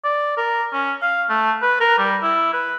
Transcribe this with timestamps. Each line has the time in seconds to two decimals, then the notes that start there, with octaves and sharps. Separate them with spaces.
0.04 D5
0.37 A#4
0.73 C#4
1.02 F5
1.30 A3
1.62 B4
1.81 A#4
1.98 G3
2.23 E4
2.53 B4